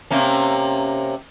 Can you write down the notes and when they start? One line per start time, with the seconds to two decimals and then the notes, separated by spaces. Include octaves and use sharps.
0.11 C3 A#3 C#4